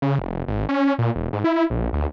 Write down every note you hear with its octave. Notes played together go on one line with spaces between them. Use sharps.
C#3
F1
G#1
C#4
A#2
E1
G#2
E4
A#1
D2